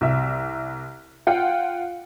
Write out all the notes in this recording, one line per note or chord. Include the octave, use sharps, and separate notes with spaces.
C2 E5
F4 F#5 G5